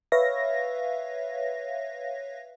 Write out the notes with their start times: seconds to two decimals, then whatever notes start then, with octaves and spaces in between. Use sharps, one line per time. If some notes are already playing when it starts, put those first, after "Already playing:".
0.12 B4 C#5 E5 F5 A#6